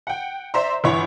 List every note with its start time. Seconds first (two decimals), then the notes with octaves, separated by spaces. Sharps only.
0.07 F#5 G5
0.54 C5 D5 E5 A#5 C6
0.84 G1 E3 C#5 F#5 B5